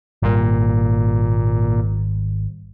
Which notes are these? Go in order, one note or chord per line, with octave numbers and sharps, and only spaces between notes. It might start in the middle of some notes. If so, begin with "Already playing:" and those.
G#1 A#2 G3